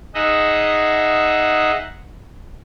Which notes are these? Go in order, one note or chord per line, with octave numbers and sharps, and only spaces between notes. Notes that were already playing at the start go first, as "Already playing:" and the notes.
D#4 G#4 D#5 E5 F#5